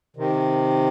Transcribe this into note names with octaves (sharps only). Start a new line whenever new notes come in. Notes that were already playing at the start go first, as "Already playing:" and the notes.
C3 D#3